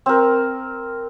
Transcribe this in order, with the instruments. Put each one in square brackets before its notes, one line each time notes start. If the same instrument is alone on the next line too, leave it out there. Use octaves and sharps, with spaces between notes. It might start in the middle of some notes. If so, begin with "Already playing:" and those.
[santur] C4 A#4